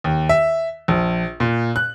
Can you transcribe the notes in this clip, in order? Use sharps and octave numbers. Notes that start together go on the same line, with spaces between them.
D#2
E5
A#1
A#2
F#6